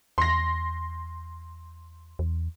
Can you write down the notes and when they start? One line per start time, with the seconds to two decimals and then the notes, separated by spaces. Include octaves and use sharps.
0.18 E2 C6 A#6
2.19 E2